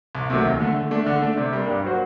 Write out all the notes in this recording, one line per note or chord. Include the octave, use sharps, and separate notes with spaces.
C2
C3 D#3 F#3 A3
D#2
D3 A3
D3
A3 D4
D3
A3 D4
C3
G3 A#3 D4
G2
F#3 A#3 F#4 C5